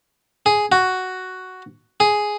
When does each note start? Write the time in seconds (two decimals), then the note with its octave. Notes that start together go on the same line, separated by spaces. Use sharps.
0.46 G#4
0.72 F#4
2.00 G#4